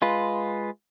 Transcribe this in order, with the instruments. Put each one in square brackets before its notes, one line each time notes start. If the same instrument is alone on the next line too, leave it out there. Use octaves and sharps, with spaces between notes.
[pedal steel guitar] G#3 F4 B4